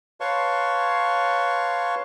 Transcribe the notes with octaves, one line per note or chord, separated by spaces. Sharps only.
B4 C#5 F5 A5 C6 C#6